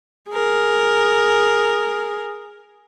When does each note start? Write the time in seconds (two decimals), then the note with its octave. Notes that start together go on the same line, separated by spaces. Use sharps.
0.30 G#4 A#4